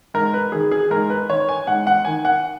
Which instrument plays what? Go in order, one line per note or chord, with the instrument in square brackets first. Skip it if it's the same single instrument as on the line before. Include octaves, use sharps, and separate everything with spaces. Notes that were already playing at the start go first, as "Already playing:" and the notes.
[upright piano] G#2 A#4
B4
D#3 G#4
G#4
G#2 A#4
B4
D#3 C#5
G#5
G#2 F#5
F#5
D#3 G#5
F#5